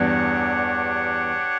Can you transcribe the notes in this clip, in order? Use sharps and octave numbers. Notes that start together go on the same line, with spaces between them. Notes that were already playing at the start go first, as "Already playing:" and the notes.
Already playing: E2 G2 D4 G4 C#5 F#5